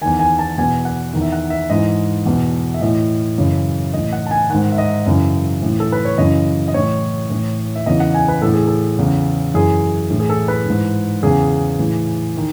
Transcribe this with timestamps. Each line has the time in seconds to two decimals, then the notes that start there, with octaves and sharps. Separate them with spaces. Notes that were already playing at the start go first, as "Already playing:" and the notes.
0.01 E2 D#3 G#5
0.20 G#5
0.39 A5
0.58 E2 B2 G#5
0.85 F#5
1.13 E2 D#3
1.22 E5
1.32 F#5
1.50 E5
1.70 G#2 E3 D#5
2.26 E2 B2
2.74 E5
2.81 A2 E3 D#5
3.38 F#2 C#3 E3
3.94 A2 E3 D#5
4.13 F#5
4.26 A5
4.31 G#5
4.50 G#2 D#3 F#5
4.72 E5
4.78 D#5
5.06 F#2 C#3 E3
5.62 A2 E3
5.80 A4
5.92 B4
6.05 C#5
6.18 F#2 C#3 E3 D#5
6.68 D#5
6.74 A2 E3 C#5
7.30 A2 E3
7.76 E5
7.86 E2 C#3 E3 D#5
8.00 F#5
8.14 G#5
8.28 B4
8.42 A2 E3 A4
8.54 G#4
8.67 A4
8.98 E2 C#3 E3
9.54 F#2 E3 G#4
10.10 A2 E3
10.20 G#4
10.29 A4
10.48 B4
10.66 G#2 E3
11.23 E2 C#3 E3 G#4
11.79 A2 E3
12.37 D#3